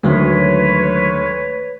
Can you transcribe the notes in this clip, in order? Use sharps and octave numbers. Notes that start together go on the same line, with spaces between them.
D2 D#3 F#3 G#3 B4 C#5